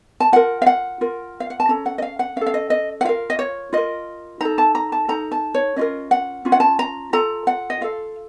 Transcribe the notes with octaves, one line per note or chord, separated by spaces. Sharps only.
A5
F4 A#4 F#5
F5
F#5
F4 A#4
F5
F#5
A5
C#4 A4 A#5
F#5
D#5
F5
F#5
C#4 F5
A4
F5
D#5
D#5
F#5
F4 A#4 F5
D#5
C#5
F4 A#4 D#5
D#4 A4 A#5
A5
A#5
A5
D#4 A4 A#5
A5
C#5
C#4 F4 A#4 D#5
F#5
C#4 F4
F#5
A5
A#5
F4 A4 A#5
F#5
D#5
F4 A4 F5